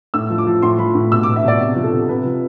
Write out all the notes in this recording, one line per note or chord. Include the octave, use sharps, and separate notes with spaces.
A2 E6
F3
D6
F3
A2 C6
F3 B5
A2
B2 E6
D6
B2
E5
B2 D5
C3
F3
A4
C3
C3 B4
F3